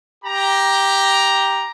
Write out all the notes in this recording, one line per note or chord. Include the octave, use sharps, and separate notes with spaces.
G4 A#5